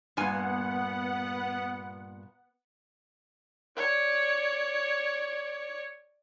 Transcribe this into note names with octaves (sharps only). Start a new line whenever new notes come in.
G2 A#2 B3 F#5 G#5
C#5 D5